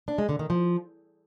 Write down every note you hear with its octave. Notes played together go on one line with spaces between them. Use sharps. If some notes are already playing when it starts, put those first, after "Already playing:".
D4
G#3
D3
D#3
F3